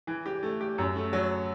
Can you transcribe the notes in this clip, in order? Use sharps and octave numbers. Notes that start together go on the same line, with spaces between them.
E3
G4
A3
G4
F#2
A3
F#3